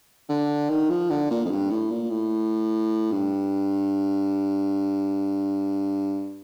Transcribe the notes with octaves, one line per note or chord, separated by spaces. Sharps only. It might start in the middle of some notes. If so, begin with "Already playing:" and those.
D3
D#3
F3
D3
A#2
F2
G2
A2
A#2
A2
G2